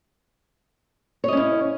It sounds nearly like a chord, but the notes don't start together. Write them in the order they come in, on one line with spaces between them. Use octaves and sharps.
C#5 D#5 C#4 E4